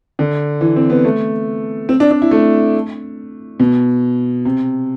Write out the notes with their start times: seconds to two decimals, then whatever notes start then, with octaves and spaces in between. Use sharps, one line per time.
0.19 D3
0.61 E3
0.76 C4
0.90 B3
1.05 A3
1.89 C4
2.00 D4
2.11 D4
2.22 E4
2.31 A3
3.60 B2
4.45 C3